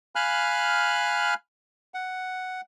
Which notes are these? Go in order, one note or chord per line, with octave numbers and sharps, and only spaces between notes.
F5 G#5 B5 F6 F#6
F#5